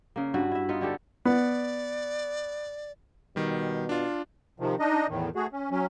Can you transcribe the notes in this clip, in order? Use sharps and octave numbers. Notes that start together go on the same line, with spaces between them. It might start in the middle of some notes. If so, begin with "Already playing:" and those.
C#3 A#3
G2 F#4 B4 E5
E4 E5
B3 D#4 F4
D3 F#4 G4 A4
B3 D5
B2 D#3 G3
D4 F4
C3 D#3 F3
D4 D#4 D#5
E2 A2 D#3
A3 F#4 G#4
C#4
F#3 C#4